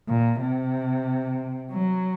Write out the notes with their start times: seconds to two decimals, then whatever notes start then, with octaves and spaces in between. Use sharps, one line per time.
0.08 A#2
0.41 C3
1.72 F#3